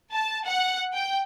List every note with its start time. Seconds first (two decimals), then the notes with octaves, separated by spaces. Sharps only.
0.13 A5
0.47 F#5
0.94 G5